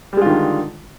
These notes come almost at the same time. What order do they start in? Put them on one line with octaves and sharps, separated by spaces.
G3 G#3 F4 D#3 D3